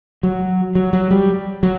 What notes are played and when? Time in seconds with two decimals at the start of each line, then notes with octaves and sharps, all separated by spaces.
0.23 F#3
0.75 F#3
0.93 F#3
1.11 G3
1.63 F#3